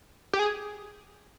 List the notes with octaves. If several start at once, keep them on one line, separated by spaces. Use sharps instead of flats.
G4
G#4